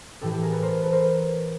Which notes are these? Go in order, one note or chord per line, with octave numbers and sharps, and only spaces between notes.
A2 E3 G4 A4
G4 A4
G#4 A#4
A4 B4
A#4 C5
A4 B4
A#4 C5